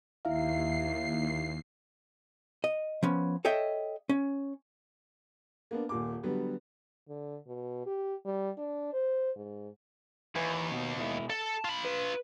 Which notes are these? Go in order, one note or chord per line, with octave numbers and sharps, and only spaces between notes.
D#2 E4 E5 F5 C7
D#5
F3 B3 C#4
A4 C#5 D#5 E5 G5
C#4
A#3 B3 D4
D#1 A#2 D6
D3 F#3 G3 B3
D3
B2
G4
G3
D4
C5
G#2
D#2 E3 B4
B2
B2 E4
A4 A5
F4 B5
B4